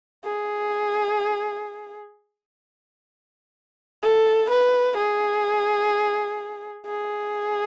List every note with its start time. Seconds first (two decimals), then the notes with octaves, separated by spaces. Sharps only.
0.24 G#4
4.03 A4
4.49 B4
4.96 G#4
6.85 G#4